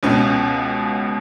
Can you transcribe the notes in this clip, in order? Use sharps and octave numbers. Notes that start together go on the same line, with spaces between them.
C#2 B2 C#4